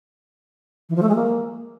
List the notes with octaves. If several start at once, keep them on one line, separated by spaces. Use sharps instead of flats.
E3
F3
A3
G#3
A#3